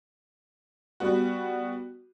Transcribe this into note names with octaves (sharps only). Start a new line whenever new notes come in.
G3 B3 F#4